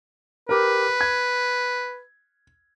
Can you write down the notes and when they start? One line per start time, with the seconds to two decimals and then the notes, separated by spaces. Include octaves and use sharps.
0.49 G4 A#4 B4
1.01 G#6